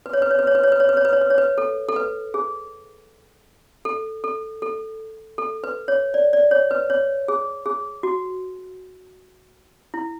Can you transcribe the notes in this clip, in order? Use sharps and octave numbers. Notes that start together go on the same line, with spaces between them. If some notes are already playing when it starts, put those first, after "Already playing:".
B4
C#5
B4
C#5
B4
C#5
B4
C#5
B4
C#5
B4
C#5
B4
C#5
B4
C#5
B4
A4
A4
B4
G#4
A4
A4
A4
A4
B4
C#5
D5
D5
C#5
B4
C#5
G#4
G#4
F#4
E4